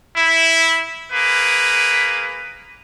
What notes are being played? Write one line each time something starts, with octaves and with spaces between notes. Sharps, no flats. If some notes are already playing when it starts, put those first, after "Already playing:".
E4
A#3 G#4 B4